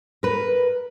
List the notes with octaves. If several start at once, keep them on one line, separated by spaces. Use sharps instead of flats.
A#4 B4